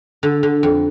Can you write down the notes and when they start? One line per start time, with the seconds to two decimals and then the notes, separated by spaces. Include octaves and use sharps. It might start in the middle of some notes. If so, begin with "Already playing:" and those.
0.23 D3
0.43 D3
0.63 F2